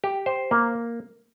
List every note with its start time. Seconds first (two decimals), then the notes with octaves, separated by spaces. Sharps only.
0.04 G4
0.26 C5
0.51 A#3